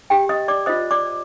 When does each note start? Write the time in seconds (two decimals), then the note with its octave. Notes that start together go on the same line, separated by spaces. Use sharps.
0.10 G4 G5
0.29 D#5 D#6
0.48 D5 D6
0.66 F4 C5 D#5 D#6
0.91 D5 D6